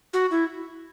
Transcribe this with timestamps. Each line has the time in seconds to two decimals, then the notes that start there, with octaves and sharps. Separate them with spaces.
0.14 F#4
0.31 E4